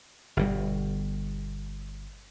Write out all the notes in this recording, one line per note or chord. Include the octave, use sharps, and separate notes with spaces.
G1 B2 G3